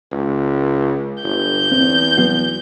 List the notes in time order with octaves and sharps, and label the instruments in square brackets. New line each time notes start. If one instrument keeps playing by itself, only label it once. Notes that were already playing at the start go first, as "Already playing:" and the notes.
[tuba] C#2
[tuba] G1 [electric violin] G6
[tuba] E2 [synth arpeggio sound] C4
[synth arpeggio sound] F#3 B3 F#4